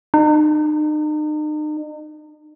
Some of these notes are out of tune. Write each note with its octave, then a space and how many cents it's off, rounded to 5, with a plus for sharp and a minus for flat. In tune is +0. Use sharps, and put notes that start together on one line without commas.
D#4 -40